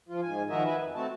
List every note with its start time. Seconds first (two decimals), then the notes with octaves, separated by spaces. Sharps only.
0.09 F3 F4
0.22 G#2 G#5
0.50 D#3 F3 F#4 A#4 D#5 E5
0.65 B4 E5 G#5
0.81 F2
0.95 A3 C4 F#4 A5